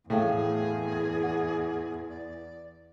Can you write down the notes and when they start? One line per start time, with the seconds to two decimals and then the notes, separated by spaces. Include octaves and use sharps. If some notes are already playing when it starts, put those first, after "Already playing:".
0.10 E2 A2 G#4 F5 G5
1.23 F#5
2.10 D5